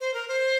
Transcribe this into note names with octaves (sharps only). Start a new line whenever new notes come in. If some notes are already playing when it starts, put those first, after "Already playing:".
C5
A#4
C5